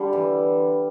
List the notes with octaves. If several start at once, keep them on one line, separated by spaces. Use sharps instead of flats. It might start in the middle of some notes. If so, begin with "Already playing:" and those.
Already playing: D3 G3
E3